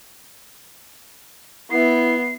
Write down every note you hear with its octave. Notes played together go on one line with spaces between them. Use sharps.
B3 E4 C7